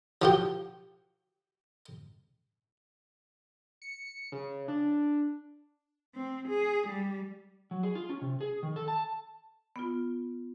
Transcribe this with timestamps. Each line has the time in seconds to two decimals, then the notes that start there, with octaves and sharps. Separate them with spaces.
0.22 F3 F#4 G4
3.82 C#7
4.32 C#3
4.68 D4
6.15 C4
6.48 G#4
6.88 G3
7.71 F#3
7.83 G#4
7.95 F4
8.09 C#4
8.21 C3
8.41 G#4
8.63 D#3
8.76 A4
8.88 A5
9.76 B3 F4